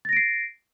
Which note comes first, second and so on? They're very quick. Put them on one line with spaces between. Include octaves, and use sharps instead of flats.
A6 A#6 D7 C7